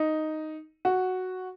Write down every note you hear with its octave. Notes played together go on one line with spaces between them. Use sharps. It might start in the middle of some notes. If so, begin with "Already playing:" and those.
Already playing: D#4
F#4